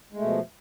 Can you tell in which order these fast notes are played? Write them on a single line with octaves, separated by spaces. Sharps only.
G#3 A3 B2 F3